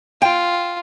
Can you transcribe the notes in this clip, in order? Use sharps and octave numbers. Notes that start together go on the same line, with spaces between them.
F4 G5